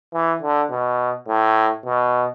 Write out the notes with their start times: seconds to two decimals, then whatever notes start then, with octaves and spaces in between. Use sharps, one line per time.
0.13 E3
0.42 D3
0.71 B2
1.28 A2
1.86 B2